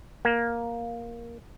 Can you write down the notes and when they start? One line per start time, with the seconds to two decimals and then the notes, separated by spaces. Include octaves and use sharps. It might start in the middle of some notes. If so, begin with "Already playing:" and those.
0.25 A#3